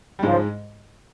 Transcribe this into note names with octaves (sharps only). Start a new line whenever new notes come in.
G3
C#2 G#2 C#3 F3 G#3